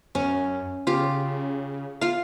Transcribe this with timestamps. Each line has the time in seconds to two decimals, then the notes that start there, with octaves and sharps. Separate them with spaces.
0.15 F#2 C#4
0.87 C#3 F4 G4
2.01 F4 F5